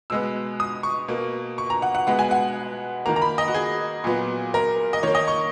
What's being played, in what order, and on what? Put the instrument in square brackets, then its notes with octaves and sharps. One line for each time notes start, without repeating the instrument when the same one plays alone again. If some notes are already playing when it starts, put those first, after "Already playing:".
[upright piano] B2 G#3 B3 E6
D#6
C#6
B2 A#3
C#6
A#5
F#5
F#5
B2 G#3 B3 F#5
G#5
F#5
D#3 A#3 A#5
A#5
B5
D#5
F#4
G#4
A#2 F#3 B3
A#4
D#5
D#3 A#3 C#5
D#5
C#6